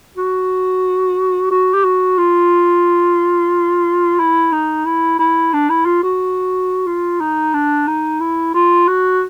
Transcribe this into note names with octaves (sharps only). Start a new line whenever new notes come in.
F#4
F#4
G4
F#4
F4
E4
D#4
E4
E4
D4
E4
F4
F#4
F4
D#4
D4
D#4
E4
F4
F#4